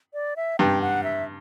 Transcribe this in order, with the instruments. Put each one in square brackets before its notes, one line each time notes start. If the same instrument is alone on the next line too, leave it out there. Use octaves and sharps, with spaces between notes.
[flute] D5
E5
[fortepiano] G2 [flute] G5
[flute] F#5
E5